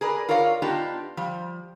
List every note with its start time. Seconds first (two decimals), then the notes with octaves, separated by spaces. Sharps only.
0.01 G#4 A#4 B4 D5
0.29 F4 A#4 C#5 D5 F5
0.62 B3 D4 D#4 F4 G4
1.17 F3 G3